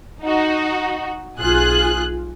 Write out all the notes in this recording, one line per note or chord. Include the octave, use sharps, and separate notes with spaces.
D#4 F#4
B1 F4 G#4 F#6